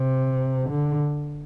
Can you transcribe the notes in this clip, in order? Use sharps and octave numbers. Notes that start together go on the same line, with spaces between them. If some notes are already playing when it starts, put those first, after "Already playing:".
Already playing: C3
D3